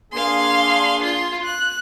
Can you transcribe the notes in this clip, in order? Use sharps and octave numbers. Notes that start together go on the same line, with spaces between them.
A#3 D4 G#4 F5 C6
F4 C6
F#6